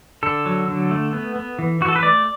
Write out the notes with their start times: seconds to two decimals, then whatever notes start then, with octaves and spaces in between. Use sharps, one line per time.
0.23 D3 A4
0.46 F#3
0.67 D3
0.91 A3
1.13 B3
1.36 B3
1.59 E3
1.81 E3 F#4
1.88 A4
1.96 B4
2.03 A3 D5